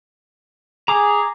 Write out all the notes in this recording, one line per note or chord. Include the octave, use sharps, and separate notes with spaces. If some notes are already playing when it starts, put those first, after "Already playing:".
G#4 A#5 D6 D#6